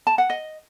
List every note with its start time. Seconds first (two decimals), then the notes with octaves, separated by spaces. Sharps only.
0.07 A5
0.18 F#5
0.30 D#5